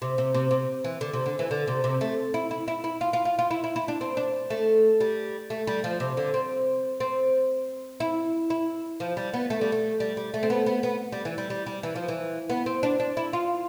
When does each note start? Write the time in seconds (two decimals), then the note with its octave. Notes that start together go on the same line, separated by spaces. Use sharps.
0.02 C3
0.18 C3
0.34 C3
0.51 C3
0.84 E3
1.01 D3
1.13 C3
1.26 D3
1.39 E3
1.51 D3
1.67 C3
1.84 C3
2.01 A3
2.34 E4
2.51 E4
2.68 E4
2.84 E4
3.01 F4
3.13 F4
3.25 F4
3.39 F4
3.51 E4
3.64 E4
3.76 E4
3.88 D4
4.01 C4
4.17 D4
4.50 A3
5.00 G3
5.50 A3
5.67 G3
5.84 F3
6.00 C3
6.17 D3
6.34 C4
7.00 C4
8.00 E4
8.50 E4
9.00 F3
9.17 G3
9.33 B3
9.50 A3
9.61 G3
9.72 A3
10.00 G3
10.17 G3
10.34 A3
10.43 C4
10.50 B3
10.66 B3
10.83 B3
11.12 G3
11.25 E3
11.38 G3
11.50 G3
11.66 G3
11.83 E3
11.95 F3
12.08 E3
12.49 B3
12.66 C4
12.83 D4
13.00 D4
13.17 E4
13.33 F4